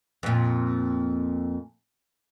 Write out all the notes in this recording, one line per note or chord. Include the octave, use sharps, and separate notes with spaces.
F2 A#2